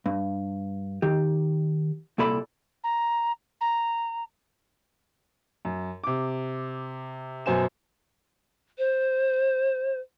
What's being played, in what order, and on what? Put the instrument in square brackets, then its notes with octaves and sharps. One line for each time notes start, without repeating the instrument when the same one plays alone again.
[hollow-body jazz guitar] G2
D#3 G4
C2 A#2 A4 D5 B5
[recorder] A#5
A#5
[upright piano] F#2
C3 D6
F#2 B2 C5 G#5 E7
[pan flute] C5